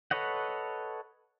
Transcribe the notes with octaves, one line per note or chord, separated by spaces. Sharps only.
A4 B4 C#5 D#5 F#5